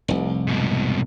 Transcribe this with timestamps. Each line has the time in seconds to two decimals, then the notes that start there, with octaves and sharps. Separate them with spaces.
0.08 F1 C2
0.47 G#2 B2